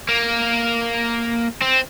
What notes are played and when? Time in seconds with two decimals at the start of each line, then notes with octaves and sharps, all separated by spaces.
0.09 A#3
1.61 C4